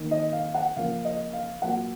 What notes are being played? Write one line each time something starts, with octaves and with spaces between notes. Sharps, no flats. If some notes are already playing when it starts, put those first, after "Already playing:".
Already playing: D#3 A#3
D#5
F5
F#5
C#3 F3 A#3 F5
D#5
F5
A#2 F#3 A#3 F#5